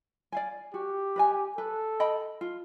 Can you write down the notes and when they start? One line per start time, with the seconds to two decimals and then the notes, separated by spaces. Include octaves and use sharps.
0.32 D5 F5 G#5
0.74 F#4 G4
1.16 B4 D#5 G#5
1.57 A4 B4
2.00 D#5 G5 B5
2.41 F4